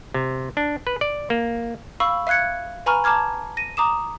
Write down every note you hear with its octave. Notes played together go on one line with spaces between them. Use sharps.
C3
D4
B4
D5
A#3
F5 B5 C#6 E6
E5 F5 F#6 G#6 C#7
B4 G#5 A#5 B5 C#6 F6
A5 A#5 D6 F6 G#6
A#6 D#7
A#5 D6 D#6 E7